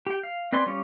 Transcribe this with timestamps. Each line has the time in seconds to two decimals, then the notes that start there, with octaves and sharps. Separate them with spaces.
0.07 G4 G5
0.23 F5
0.52 C4 B4 D5 G#5 C6
0.66 G3 C#4 F4 C#5 D5